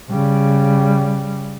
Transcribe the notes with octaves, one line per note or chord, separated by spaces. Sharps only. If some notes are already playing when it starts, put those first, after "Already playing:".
C#3 G3